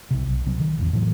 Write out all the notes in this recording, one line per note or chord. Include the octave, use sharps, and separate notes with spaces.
B1 C3
B1
C2 C3 F#3
D#3
A1 E2
A2 E3 F#3